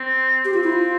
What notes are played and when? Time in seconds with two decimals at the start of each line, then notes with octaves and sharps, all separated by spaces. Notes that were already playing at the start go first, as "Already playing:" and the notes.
Already playing: C4
0.45 C4 G4
0.54 F4
0.64 E4
0.73 F4